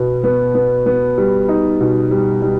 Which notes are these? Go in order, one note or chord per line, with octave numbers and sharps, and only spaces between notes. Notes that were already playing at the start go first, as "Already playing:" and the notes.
Already playing: B2 B3
B3
B3
B3
G3
D#4
B2
G3
G3